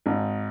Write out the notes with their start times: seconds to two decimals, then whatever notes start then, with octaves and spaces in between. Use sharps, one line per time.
0.06 G#1